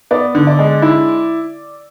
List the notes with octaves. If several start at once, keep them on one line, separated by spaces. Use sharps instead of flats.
B3 D5
D3
D5
G#3
E4